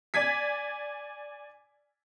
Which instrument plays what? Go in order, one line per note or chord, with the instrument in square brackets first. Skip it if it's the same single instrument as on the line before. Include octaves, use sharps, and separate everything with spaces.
[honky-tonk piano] D5 G#5 G#6 B6